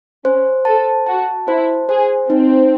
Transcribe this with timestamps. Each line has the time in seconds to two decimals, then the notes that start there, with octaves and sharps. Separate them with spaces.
0.24 C#4 C5
0.65 A4 A5
1.06 F#4 A5
1.47 E4 C5
1.88 G#4 C5
2.29 C4 D#4